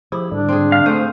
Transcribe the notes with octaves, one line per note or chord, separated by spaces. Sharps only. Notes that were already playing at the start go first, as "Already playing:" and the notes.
F3 E4 G4 G#4
G#2 D3 G3 D4
C4 G#4
F5
A3 C4 C5 G#5 D#6